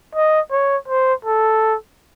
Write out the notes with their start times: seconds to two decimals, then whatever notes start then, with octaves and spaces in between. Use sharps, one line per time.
0.15 D#5
0.51 C#5
0.88 C5
1.25 A4